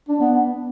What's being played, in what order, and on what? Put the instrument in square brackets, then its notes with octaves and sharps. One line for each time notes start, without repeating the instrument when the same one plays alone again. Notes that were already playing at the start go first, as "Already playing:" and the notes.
[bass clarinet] D4
B3